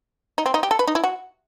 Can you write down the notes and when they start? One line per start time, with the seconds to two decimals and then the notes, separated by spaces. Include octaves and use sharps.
0.38 D#4
0.46 C4
0.54 D#4
0.63 G4
0.71 A4
0.79 B4
0.87 D#4
0.95 E4
1.04 F#4